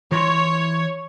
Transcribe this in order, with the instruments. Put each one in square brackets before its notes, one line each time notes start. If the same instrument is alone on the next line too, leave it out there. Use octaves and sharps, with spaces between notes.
[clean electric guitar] E3 E4 C6 [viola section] C#5